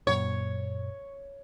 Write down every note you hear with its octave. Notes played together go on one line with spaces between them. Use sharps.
F#2 A#2 C#5